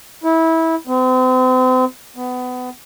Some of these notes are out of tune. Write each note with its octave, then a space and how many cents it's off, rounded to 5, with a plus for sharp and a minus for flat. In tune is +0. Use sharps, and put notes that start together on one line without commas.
E4 -20
C4 -40
B3 +25